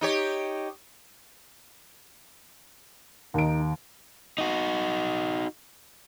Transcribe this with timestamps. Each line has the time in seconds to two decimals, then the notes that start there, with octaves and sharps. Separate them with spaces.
0.01 D#4 G4 C#5
3.34 D#2 D#4 D7
4.38 D#4 F#4